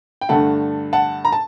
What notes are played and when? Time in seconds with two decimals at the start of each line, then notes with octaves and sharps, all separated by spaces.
0.21 G5
0.29 G2 D3 A3 F#5 A5
0.93 F#5 A5
1.25 A#5
1.32 A5